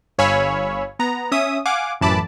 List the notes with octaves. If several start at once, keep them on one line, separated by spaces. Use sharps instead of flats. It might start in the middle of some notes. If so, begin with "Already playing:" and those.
G1 C#5 F5 G#5 B5 E6
B3 A#5
C#4 E5 D#6
F5 F#5 G#5 D6
A1 F#2 E3 A5 B5 D6